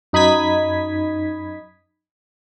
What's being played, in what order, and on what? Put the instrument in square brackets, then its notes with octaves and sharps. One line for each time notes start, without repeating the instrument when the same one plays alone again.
[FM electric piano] F#2 D#4 B5 D#6 G#6 B6